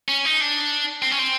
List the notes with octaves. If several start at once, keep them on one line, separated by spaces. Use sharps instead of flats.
C#4
D#4
D4
C4
C#4
C4